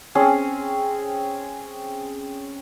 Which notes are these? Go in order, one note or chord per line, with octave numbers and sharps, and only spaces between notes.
C4 C#4 G#4